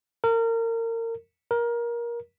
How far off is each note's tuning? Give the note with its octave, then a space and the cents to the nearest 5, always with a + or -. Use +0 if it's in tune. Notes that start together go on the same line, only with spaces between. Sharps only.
A#4 -30
A#4 +20